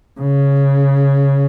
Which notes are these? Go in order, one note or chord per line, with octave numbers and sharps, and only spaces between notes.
C#3